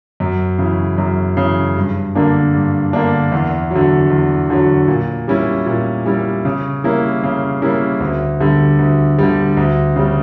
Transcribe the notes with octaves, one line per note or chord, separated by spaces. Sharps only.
F#2
C#3 E3
F#2
C#3
E3
G2
D3 A#3 D4
G2
D3 A#3 D4
E2
D3 F#3
E2
D3 F#3
A#2
G3 C#4 E4
A#2
G3 C#4 E4
C#3
G3 A#3 C#4 E4
C#3
G3 A#3 C#4 E4
D2
D3 G3
D2
D3 G3
D2
C#3 G3